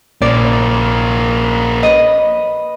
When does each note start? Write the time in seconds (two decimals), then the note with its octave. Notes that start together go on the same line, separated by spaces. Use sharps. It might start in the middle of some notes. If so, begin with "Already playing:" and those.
0.22 A#1 A#3 C#4 D5
1.83 B4 D#5